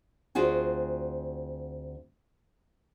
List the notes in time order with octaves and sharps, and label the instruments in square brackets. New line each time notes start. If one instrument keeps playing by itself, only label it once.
[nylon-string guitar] D2 C4 F4 F#4 G#4